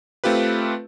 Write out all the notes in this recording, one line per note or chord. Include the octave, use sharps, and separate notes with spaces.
A3 C4 F4 G4 B4